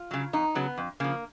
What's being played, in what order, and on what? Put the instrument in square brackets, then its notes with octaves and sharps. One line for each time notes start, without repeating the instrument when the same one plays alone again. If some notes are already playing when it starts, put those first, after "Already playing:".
Already playing: [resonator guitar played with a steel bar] F4
C#3 F#3
F2 D#4
C#3 F#3 B3
F2
C#3 F3 A#3